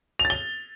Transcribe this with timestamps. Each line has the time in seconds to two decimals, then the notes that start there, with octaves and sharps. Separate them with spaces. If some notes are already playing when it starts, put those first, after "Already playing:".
0.19 F7
0.25 A6
0.30 G7